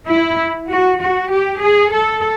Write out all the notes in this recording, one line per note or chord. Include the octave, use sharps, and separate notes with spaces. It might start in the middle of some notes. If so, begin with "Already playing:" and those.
E4
F#4
F#4
G4
G#4
A4